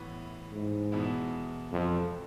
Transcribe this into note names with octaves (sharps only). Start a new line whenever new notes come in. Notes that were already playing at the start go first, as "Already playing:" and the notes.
Already playing: A2 E3 B3
G#2
E2 B2 G#3 B3 E4
F2